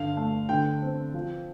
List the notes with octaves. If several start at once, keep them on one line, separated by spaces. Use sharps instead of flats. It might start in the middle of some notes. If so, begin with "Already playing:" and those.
Already playing: G2 D3 F5
A3
D3 G5
C4
F3